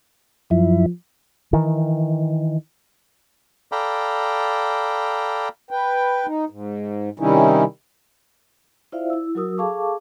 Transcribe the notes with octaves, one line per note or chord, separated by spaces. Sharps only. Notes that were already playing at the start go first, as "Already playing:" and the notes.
F#2 F3 E4
D#3 E3
A4 D5 F5 G5 A#5 B5
B4 G5
D#4
G#2
C3 D#3 G3 C#4 D#4 E4
E4 F4 C5 D5 E5 F5
E4 E6
F#3 F#4 A#4 D#6 E6
G#4 A4 F5 A5 C#6 D6